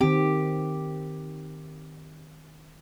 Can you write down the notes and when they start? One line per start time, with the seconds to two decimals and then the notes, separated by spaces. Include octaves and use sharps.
0.01 D#3 C4 G4